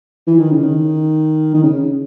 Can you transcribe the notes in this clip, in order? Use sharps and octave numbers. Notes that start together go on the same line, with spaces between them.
E3
D#3
C#3
D#3
D#3
C#3